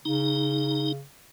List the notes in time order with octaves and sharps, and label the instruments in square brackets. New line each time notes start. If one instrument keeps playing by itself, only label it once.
[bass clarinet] C#3 [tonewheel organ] D#4